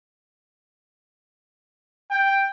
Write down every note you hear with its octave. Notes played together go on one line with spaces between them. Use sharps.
G5